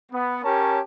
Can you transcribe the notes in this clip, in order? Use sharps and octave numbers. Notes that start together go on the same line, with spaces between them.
B3
C#4 G4 A#4 C#5 A5